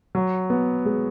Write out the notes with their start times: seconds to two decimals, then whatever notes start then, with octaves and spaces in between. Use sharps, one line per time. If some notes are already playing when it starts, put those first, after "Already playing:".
0.15 F#3
0.50 B3
0.85 G#3